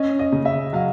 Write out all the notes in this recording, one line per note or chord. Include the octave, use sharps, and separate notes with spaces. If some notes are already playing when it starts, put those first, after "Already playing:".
Already playing: C#4 D#5
D#5
C#3
E5
F#3 F5